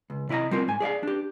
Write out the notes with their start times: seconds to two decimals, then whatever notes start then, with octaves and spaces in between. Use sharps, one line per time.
0.10 C#2
0.29 C3 E4 D5 D#5 A#5
0.51 G3 C4 F4 A#4
0.68 G#2 G#5
0.80 G#4 D5 E5 F5
1.03 D4 G4